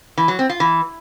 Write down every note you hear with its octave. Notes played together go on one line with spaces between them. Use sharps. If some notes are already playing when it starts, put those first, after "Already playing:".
E3
F#3
C4
F4
E3